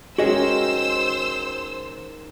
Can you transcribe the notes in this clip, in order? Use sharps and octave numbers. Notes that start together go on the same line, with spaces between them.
D#3 G#3 C#4 F#4 G#4 C5 D#5 E6